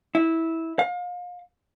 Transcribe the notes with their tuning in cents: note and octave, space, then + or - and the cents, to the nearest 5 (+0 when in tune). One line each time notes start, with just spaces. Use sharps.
E4 -15
F5 +35